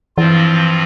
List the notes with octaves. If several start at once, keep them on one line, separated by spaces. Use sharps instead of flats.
G2 E3 F3 C4 F4